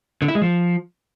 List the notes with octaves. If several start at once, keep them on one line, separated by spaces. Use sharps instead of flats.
D3
E4
G#3
F3